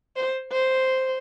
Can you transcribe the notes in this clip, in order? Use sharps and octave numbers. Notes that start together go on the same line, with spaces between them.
C5
C5